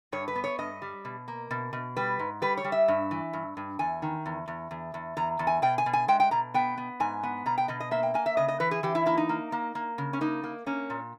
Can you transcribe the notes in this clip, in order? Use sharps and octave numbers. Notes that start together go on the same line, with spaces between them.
G2 C#5
B4
B3
C#5
G2 D#5
G3
B2
A#3
B2
B2
G3 B4
G#2
G3 B4
C#5
G3
E5
G2
E3
G2
G2
E2 G#5
D#3
E2
E2
E2
E2
E2 A#5
E2
G#5
B2 G5
G#5
B2
G#5
G#3 G5
G5
B2 A#5
B3 G5
B3
G#2 G#5
B3
B2 A#5
G5
B2 D#5
D#5
A#3 E5
G5
A#3 G#5
E5
C#3 D#5
D#5
E3 B4
G#4
E3 G4
E4
A#3 E4
D#4
A#3
A#3
A#3
C#3
C#4
A#3 D#4
A#3
A#3 C#4
A#2